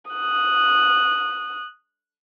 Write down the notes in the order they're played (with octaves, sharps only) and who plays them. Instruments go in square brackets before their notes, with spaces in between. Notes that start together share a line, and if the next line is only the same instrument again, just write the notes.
[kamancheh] D#6 F#6